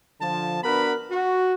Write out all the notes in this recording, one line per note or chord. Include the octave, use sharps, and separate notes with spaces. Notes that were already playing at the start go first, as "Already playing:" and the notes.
D3 F3 A5
B3 D4 F#4 A#4 B4 B5
F#4